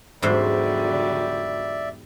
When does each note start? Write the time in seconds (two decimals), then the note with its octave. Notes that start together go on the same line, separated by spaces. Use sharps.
0.22 E2 G#2 D3 F#3 G3 C5 D5 E5